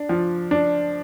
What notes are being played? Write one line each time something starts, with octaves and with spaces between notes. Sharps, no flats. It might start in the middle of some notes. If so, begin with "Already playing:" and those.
Already playing: D4
F3
D4